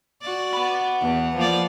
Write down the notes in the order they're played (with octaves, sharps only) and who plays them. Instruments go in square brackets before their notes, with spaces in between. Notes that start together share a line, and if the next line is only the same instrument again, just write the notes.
[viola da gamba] F#4 D5
[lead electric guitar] F#5 B5
[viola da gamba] E2
F3 A#3 D5